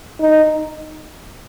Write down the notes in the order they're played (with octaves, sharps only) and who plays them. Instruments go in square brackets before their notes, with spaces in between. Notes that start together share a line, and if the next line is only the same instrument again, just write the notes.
[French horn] D#4